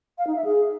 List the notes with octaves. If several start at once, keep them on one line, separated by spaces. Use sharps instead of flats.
F5
D#4
E5
G#4